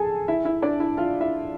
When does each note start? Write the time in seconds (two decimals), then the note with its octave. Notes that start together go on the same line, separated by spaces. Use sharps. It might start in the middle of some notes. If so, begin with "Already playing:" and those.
Already playing: G#4 A4 G#5 A5
0.28 E4 E5
0.45 E4 E5
0.62 D4 D5
0.80 E4 E5
0.97 F4 F5
1.20 E4 E5